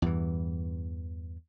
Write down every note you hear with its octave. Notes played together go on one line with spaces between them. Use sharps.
E2 G2 E3